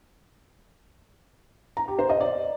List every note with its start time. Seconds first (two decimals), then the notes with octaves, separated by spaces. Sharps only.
1.77 A#5
1.88 G4
1.99 C5
2.10 D#5
2.20 D5